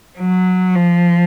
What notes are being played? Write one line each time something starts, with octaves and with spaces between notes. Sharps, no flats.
F#3
F3